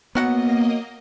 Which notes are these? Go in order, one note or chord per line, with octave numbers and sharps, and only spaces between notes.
F#3 A#3 B3 F#4 D#5 F#5